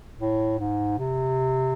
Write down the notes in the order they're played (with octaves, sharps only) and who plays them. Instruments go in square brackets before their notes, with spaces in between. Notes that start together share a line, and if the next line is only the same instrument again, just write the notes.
[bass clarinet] A2
G#2
C3